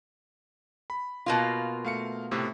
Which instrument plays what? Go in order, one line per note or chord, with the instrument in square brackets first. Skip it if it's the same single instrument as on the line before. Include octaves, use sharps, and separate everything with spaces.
[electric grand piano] B5
[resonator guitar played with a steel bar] B2 A#3 F4
[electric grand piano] A3 F5 C#7
A2 C3 A3